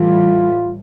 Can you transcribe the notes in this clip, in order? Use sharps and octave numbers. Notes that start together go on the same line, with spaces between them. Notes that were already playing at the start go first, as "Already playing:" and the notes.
Already playing: A2 E3 G3 F4